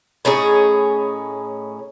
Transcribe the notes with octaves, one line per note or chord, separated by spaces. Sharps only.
A2 C#4 D#4 G#4